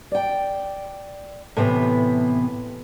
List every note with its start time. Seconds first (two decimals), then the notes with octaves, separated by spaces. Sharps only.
0.12 D5 G5
1.57 A2 C3 E3 B3